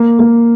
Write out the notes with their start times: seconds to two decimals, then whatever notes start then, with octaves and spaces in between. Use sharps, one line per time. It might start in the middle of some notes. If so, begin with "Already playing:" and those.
Already playing: A#3
0.19 A#3